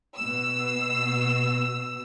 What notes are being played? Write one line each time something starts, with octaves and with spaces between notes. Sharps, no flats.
B2 E6